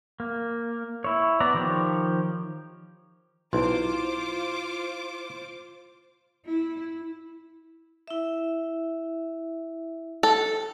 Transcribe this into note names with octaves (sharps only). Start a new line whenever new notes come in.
A#3
E4 C#5
B3 D5 A#5
D#3 F3 G4 C#5
B1 E4 F4 C5 C6 D6
E4
E4 E5
A4